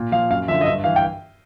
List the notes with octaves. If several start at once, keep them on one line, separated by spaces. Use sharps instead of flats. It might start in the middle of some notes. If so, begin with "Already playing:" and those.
Already playing: A#2
F3 F5
F#2 F5
D3 F3 E5
D#5
G2 E5
E3 F5
G5